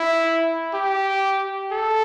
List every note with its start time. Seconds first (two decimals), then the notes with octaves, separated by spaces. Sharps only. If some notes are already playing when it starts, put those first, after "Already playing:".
Already playing: E4
0.74 G4
1.72 A4